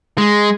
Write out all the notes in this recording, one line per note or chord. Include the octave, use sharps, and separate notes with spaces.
G#3